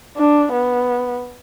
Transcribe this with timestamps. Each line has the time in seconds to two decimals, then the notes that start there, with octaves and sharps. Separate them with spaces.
0.17 D4
0.52 B3